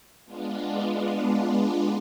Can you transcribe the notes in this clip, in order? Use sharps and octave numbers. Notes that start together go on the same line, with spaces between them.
G#3 B3 D4 F4